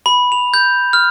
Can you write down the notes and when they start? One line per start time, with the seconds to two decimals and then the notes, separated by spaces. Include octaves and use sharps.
0.06 B5
0.32 F7
0.54 G6
0.93 F6